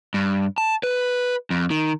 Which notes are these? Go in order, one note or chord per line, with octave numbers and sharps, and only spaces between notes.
G2
A5
B4
F2
D#3